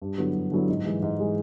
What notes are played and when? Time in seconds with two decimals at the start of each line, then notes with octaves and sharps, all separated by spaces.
0.02 G2
0.18 D3 F#3 B3 E4
0.35 G2
0.51 D3 F#3 B3 E4
0.68 G#2
0.86 E3 G#3
1.02 G#2
1.20 E3 G#3